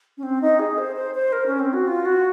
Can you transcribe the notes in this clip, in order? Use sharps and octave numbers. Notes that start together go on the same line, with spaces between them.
C#4
C4
D#4
G#4
C5
C5
C5
A#4
C#4
C4
F#4
F4
F#4